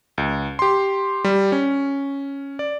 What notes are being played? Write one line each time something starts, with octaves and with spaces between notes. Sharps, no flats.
C#2
G4 C6
G3
C#4
D5